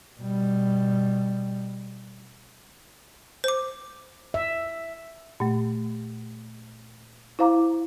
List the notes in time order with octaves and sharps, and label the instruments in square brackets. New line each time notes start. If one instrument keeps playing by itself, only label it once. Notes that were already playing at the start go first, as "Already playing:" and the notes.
[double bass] B2 G3
[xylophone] C5 D6
[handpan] E5
[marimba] A#2 A3
E4 C5 F5 A#5 D6